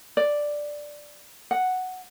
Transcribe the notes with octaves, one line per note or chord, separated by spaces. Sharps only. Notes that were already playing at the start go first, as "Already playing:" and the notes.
D5
F#5